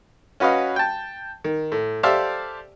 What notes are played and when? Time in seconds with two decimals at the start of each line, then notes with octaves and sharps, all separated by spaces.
0.40 C#4 F#4 B4 D#5 F5
0.76 G5 A5
1.44 D#3
1.72 A2
2.03 G4 A4 C5 D5 E5 F5